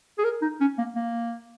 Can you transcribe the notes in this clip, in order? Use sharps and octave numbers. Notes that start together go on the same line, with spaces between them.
G#4
A#4
D#4
C#4
A#3
A#3